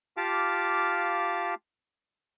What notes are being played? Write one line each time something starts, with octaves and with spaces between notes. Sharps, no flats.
F4 G4 F5 A5 D6